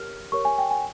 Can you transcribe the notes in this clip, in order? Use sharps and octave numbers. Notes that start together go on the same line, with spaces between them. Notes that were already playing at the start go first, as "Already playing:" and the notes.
Already playing: G4 A#4 C#5 F6
G4 A#4 C#5 C#6
G#5
G5
G#5